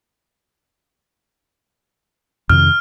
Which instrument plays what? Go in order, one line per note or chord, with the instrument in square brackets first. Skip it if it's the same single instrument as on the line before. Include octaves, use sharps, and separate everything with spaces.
[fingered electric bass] F2 C3 D#3 [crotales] F6